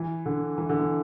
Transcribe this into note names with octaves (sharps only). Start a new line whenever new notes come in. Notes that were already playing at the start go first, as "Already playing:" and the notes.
Already playing: E3
D3
E3
D3
E3